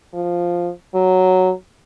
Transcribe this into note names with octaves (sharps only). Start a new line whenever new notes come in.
F3
F#3